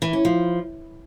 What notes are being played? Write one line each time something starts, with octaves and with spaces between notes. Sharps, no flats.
E3
C#4
F3